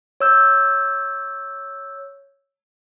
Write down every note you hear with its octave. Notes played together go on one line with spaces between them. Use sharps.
C#5 E6 G6